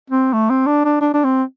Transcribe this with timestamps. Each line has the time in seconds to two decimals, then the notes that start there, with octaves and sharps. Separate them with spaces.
0.10 C4
0.33 A3
0.50 C4
0.66 D4
0.85 D4
1.01 D4
1.14 D4
1.25 C4